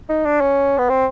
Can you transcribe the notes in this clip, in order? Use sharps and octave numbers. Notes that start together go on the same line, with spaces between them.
D#4
D4
C#4
B3
C4